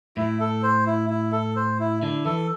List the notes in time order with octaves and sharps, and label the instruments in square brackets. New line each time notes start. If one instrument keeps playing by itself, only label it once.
[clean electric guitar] A2 [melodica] E4
[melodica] A4
C5
E4
E4
A4
C5
E4
[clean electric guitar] D3 [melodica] E4
[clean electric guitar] E3 [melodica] A4